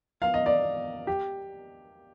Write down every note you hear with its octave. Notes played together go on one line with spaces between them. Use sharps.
F5
D#5
D5
G4